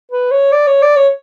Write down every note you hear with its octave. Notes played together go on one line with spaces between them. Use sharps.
B4
C#5
D5
C#5
D5
C#5